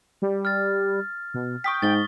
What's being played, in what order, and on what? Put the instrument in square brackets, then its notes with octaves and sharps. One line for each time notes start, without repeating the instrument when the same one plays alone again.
[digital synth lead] G3
[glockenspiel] F6 A6
[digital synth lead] B2
[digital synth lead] G5 [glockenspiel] C#6 D#6 B6
[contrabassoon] G#2 [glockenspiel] A6 G7